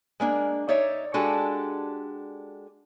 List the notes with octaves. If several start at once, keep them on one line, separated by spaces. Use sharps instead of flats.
G#3 A#3 D4
D#4 C#5 D5 E5
G#3 D4 F#4 G4 A4